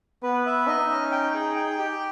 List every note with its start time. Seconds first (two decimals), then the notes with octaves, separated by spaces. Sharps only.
0.23 B3 B4
0.46 E5
0.67 D#4 D#5
0.89 C#4
1.11 G5
1.34 G#4
1.56 G5
1.78 G4